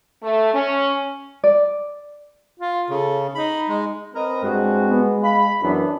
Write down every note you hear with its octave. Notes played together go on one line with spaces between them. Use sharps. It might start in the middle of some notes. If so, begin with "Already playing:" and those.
A3
C#4
D5
F4
C#3 A4
D#4 B5
G#3
C4 A#4 B4 D#5
G2 G#3 F#4
B3
F5 B5
F#2 E3 B3 D4